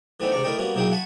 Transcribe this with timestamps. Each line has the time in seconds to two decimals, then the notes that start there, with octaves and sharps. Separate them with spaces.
0.20 E3 A3 B3 C4 D4 D#4
0.32 C#2 C3 D4 D5 A#5 C#6
0.44 A3 E4 A#4 D5 D#5 G5
0.58 G3 A#3 B3 C#4 F#4
0.75 B1 A#3 D#4 E4 G#4 G5
0.91 F#5 G#5 A5 B5 C#6